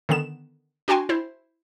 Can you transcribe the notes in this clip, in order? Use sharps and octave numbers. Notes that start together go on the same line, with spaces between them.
D3 D#3 B3 E7
D4 F#4 G5 G#5 C6
E4 C5